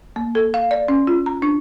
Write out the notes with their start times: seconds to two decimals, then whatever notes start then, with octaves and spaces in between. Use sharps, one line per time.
0.16 A#3
0.35 A4
0.54 F5
0.71 D5
0.88 C#4
1.07 F4
1.26 A#5
1.42 D4